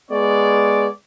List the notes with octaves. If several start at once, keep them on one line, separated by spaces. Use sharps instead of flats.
G#3 B3 C#5 D5